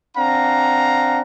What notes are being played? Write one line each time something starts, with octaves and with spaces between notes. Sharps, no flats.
C4 D4 F5 F#5 A#5